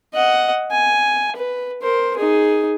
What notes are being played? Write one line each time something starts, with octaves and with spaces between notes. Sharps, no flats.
D#5 F#5
G#5
B4
A#4 C5
D#4 G#4